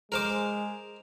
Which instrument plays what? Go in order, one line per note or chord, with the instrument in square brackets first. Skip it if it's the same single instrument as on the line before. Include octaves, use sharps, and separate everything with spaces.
[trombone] G#3 [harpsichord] A#4 C5 D6